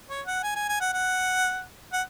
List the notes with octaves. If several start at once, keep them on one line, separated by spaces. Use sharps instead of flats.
C#5
F#5
G#5
G#5
G#5
F#5
F#5
F#5